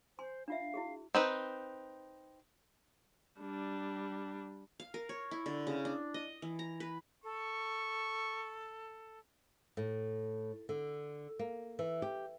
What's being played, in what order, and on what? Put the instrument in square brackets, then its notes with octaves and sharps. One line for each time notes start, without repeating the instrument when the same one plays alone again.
[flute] C5 [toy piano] G#5 C6
[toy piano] D4 F4 E5 [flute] F5
[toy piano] E4 F#4 G#4
[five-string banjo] C4 D#4 B4
[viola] G3 D4
[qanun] F5
A#4
C#5
E4
D3
C#3
D4
D#5
E3
A#5
B4
[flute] A4 [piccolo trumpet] C#6
[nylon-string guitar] A2
D3
A#3
E3
G4